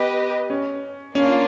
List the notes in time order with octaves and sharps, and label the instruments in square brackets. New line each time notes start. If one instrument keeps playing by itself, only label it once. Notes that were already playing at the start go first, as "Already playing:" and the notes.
Already playing: [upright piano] B3 [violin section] G4 B4 D#5
[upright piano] C#4
[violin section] A#3 D4 F4 [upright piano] C#4